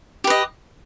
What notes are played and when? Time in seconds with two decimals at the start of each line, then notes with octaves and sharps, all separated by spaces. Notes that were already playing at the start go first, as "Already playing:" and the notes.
0.24 G4
0.27 B4
0.30 D#5